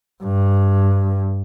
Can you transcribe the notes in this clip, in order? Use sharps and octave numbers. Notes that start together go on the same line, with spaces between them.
G2